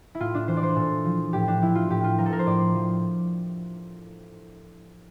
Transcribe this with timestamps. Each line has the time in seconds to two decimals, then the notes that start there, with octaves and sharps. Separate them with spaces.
0.15 E4
0.20 A2 F4
0.35 D4
0.48 E3 C5
0.57 D5
0.63 C5
0.76 A#2 A4
1.06 F3
1.33 A2 G4
1.48 D4
1.62 F3 E4
1.75 F4
1.90 A2 G4
2.04 F4
2.18 F3 A#4
2.26 A4
2.33 A#4
2.39 C5
2.46 A2 D5
2.75 F3